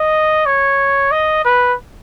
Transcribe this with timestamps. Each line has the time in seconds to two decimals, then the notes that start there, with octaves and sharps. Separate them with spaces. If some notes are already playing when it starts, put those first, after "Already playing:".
Already playing: D#5
0.46 C#5
1.12 D#5
1.45 B4